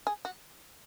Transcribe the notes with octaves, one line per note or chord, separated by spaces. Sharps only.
G#4
F#4